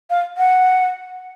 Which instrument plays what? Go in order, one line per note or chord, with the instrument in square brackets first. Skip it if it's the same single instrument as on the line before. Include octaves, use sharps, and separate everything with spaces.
[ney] F5
F#5